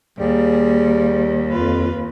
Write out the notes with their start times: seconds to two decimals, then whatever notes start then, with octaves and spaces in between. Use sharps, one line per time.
0.19 D#2 G3 A#3 G#4
1.51 F2 F4 B4